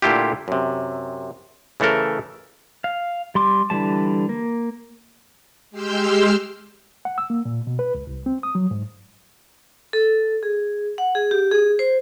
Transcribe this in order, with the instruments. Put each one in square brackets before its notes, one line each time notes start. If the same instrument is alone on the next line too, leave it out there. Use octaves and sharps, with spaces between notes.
[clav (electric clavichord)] A#2 D3 A3 E4 F4 G4
F#2 C3
C#3 E3 A3 A4 A#4
[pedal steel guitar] F5
G3 C6 D6
D3 E3 G3 A5
A#3
[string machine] G#3 G4 C6 E6 F6 G6
[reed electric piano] F#5
E6
A#3
A#2
B2
B4
C#2
C2
C4
D#6
F#3
G#2
[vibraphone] A4
G#4
F#5
G#4
G4
G#4
C5